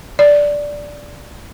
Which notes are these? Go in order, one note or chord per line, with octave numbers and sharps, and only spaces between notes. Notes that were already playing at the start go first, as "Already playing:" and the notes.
D5